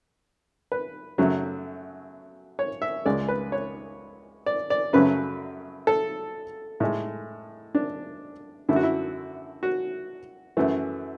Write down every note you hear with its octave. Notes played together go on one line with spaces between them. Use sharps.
B4
F#2 C#3 F#3 A3
C#5
E5
C#2 C#3 G#3 D5
B4
C#5
D5
D5
F#2 C#3 F#3 A3 B4
A4
A2 G#3
D4
F#2 D3 A3 E4
F#4
E4
F#4
F#2 E3 A3